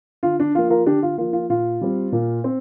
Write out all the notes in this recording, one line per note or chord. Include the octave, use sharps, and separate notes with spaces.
D3 F4
D4
F3 A#3 F4
F4 A#4
D3 D4 G4
F4
F3 A#3 F4
F4
A#2 F4
G3 C4
A#2
C4